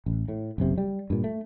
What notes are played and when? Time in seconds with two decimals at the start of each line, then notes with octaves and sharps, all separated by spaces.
0.06 A1
0.28 A2
0.58 F#1 B1 C3
0.78 G3
1.10 G2 A#2
1.24 A3